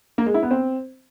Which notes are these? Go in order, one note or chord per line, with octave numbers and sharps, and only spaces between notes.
A#3
G#3
E4
B3
C4